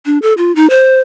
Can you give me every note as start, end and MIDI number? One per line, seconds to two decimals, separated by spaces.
0.06 0.18 62
0.22 0.33 69
0.38 0.54 65
0.56 0.69 63
0.70 1.00 72